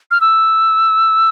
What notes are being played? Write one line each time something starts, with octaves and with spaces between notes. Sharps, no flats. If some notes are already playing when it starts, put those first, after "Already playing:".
F6
E6